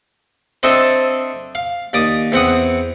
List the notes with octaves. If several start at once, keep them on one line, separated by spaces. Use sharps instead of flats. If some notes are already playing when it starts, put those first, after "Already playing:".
C4 D4 A4 C5 D#5 E5
F5
D#2 D5 D#6
E2 C4 F#5 D#6